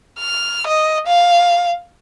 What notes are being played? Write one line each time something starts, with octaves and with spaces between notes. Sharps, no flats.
F6
D#5
F5